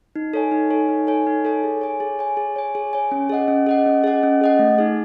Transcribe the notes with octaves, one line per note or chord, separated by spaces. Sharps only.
D#4
A4 C#5 G#5
D#4
A4 C#5 G#5
D#4
A4 C#5 G#5
D#4
A4 C#5 G#5
G#4
C#5 G#5
G#4
C#5 G#5
G#4
C#5 G#5
G#4
C#5 G#5
C#4
G#4 D#5 F#5
C#4
G#4 D#5 F#5
C#4
G#4 D#5 F#5
C#4
G#4 D#5 F#5
A3
D#4 G#4